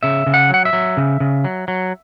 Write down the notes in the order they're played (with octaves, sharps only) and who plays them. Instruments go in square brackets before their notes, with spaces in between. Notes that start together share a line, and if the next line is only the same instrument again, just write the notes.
[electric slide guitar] C#3 E5
C#3
F#5
F#3 F#5
E5
F#3
C#3
C#3
F#3
F#3